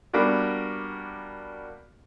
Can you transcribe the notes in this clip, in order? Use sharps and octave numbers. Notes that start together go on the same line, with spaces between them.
G3 A#3 B3 D4 F#4